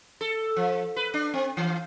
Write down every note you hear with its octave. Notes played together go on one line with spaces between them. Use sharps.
A4
F3
B4
D4
C4
E3